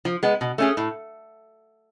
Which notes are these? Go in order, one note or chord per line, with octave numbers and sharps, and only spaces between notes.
F3
G#3 B3
B2
A3 C#4 G#4
A2